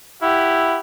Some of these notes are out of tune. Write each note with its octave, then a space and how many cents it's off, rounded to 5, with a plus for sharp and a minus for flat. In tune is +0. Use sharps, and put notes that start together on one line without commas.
E4 +5 G4 +0 F#5 +0